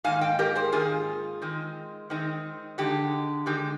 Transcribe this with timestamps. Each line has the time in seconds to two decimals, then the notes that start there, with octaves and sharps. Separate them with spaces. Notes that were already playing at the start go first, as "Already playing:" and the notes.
0.04 G#2 D#3 A#3 F5 G#5
0.21 D#5 G5
0.39 G4 A#4
0.56 G#4 C5
0.72 G#2 D#3 A#3 F4 G#4
1.42 D#3 G#3 C4 D#4
2.10 D#3 G#3 C4 D#4
2.78 D3 G#3 D#4 G4
3.46 D3 G#3 D#4 G4